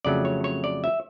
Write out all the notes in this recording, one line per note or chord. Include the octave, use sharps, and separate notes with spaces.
F2 C#3 F#3 A3 D5
C#5
C#5
D5
E5